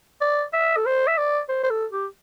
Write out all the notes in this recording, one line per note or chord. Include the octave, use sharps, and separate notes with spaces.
D5
E5
A4
C5
E5
D5
C5
C5
A4
G4